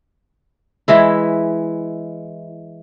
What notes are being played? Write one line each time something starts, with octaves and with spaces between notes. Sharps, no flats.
E3 G#3 E4